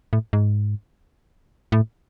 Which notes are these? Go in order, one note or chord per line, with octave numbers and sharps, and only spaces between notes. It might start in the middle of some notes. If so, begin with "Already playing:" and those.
A2
G#2
A2